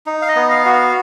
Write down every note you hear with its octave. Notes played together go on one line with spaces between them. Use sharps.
D#4
F5
D#5
B3
F5
F#4
F5